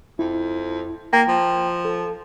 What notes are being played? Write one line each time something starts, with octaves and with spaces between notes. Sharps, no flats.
F2 E4
A#3 G5
F3
A4